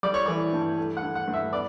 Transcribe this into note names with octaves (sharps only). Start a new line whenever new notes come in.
G3 D5
C#5
E3 D5
G2
A3
F#5
D3
F#5
G2
E5
B3 D5